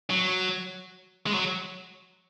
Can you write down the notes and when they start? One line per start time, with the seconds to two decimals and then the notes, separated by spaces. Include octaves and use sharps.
0.10 F#3
1.26 G#3
1.34 F#3